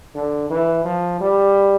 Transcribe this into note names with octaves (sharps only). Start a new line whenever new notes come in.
D3
E3
F3
G3